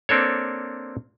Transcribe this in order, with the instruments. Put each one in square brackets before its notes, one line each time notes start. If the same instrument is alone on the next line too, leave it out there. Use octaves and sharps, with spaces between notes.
[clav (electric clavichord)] A#3 C4 D4 A4 C#5